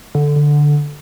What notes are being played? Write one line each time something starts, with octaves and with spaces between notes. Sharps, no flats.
D3
D3
D3